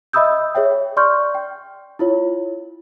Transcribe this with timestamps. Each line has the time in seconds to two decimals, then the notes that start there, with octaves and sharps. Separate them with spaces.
0.13 D#5 E5 B5 D#6 E6 G6
0.55 G#4 C#5 E5 G5
0.97 D5 C6 C#6 F6 G6
1.35 G5
1.99 E4 F4 C#5